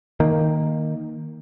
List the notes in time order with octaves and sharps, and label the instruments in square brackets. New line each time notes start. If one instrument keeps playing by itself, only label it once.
[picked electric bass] D#3 A#3